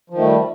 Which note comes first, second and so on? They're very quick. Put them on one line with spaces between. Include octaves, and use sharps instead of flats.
F3 D#3 A3 G3